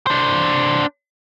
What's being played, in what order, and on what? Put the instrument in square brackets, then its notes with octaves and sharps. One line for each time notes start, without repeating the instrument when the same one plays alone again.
[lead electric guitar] D4 C5